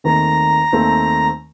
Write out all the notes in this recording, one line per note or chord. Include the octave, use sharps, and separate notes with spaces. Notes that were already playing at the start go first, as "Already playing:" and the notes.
D#2 D#3 A3 C4 A#5
D#2 D#3 A3 C4